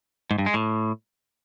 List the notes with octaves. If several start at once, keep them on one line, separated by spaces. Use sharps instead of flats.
G#2
G2
G#3
A2